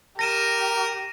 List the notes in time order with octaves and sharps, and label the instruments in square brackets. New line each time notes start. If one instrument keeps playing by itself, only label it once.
[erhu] G4 [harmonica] A#4 A#5 [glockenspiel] A#6 D#7 E7